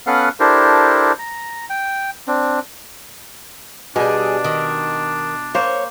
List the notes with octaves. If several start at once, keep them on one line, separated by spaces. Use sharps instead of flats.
B3 C#4 A4 B4 F5 F#5
D4 E4 G4 A4 A#4 C5
A#5
G5
C4 D4
B2 G3 D4 G#4
D#3
A#3 C5 C#5